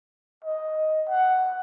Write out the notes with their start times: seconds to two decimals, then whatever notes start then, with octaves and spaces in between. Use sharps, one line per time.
0.44 D#5
1.09 F#5